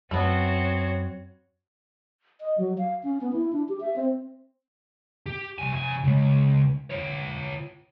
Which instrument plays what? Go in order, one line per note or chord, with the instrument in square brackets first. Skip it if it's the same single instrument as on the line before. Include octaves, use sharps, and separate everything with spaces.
[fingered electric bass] F#2 [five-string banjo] A3 B3 [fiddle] C4 F#4 [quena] C#5
[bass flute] D#5
F#3
F5
C#4
B3
E4
D4
G4
E5
C4
[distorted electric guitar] G4
C2 G#5
C3 G#5
C#3 G#3
F4 C#5